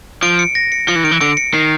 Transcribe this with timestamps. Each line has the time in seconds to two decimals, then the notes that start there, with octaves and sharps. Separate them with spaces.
0.22 F3 D7
0.39 C#7
0.55 A#6
0.72 C#7
0.88 F3 C#7
0.96 E3
1.04 D#3 D7
1.11 E3
1.21 D3 D7
1.37 C#7
1.53 D#3 C7